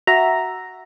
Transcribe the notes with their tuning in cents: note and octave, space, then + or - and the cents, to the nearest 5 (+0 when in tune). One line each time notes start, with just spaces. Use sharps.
F#4 +0 E5 +0 A#5 +0